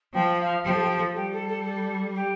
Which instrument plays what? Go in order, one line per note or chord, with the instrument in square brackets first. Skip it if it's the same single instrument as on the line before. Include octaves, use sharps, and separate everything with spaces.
[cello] F3 [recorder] G5
[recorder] F5
[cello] F3 [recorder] G4
[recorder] A4
G4
A4
[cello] G3 [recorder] G4
[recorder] A4
A4
A4
G4